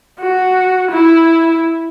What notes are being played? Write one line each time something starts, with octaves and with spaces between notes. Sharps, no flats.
F#4
E4